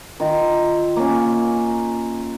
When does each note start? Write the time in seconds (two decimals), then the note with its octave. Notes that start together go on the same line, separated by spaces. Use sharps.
0.20 D#3 F4
0.96 A#3 C#4